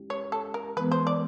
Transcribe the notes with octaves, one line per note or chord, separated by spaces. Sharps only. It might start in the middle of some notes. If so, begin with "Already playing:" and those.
Already playing: G#3 C#4 E4 G4
C#5
A4
A#4
E3 G#3 B3 B4
C5
D5